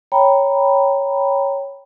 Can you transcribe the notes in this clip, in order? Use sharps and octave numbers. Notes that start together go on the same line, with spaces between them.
C#5 G5 A#5 B5